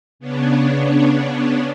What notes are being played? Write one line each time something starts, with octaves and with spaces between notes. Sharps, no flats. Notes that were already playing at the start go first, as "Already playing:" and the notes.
C#3 B3 C#4 D4